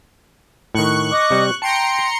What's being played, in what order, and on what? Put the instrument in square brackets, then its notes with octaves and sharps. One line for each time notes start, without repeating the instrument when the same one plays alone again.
[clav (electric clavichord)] A2 D#3 [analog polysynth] C#6 F#6
[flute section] D#5 D6 D#6
[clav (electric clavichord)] C3 G3
[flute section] G5 [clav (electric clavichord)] A5 [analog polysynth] A#5 C6 C#7